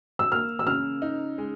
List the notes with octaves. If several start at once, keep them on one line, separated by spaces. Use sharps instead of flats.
E6
A#3 F6
E6
C#3 F6
D#4
G#3